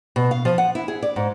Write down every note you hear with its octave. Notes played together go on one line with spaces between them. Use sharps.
B2
F5
F3
F#5
E4
G#4
D5
G#2